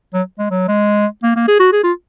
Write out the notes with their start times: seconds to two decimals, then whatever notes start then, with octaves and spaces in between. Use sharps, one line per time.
0.14 F#3
0.39 G#3
0.50 F#3
0.68 G#3
1.23 A#3
1.36 A#3
1.48 G#4
1.60 F#4
1.73 G#4
1.83 F4